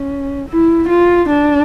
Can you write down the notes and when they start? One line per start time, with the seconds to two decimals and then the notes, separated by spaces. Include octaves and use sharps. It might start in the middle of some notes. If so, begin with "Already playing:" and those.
Already playing: C#4
0.49 E4
0.89 F4
1.29 D4